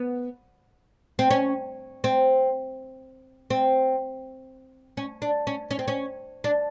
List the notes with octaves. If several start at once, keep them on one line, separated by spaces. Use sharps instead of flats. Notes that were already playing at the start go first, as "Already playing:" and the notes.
Already playing: B3
C4
C#4
C4
C4
C#4
D4
C#4
C#4
C4
C#4
D4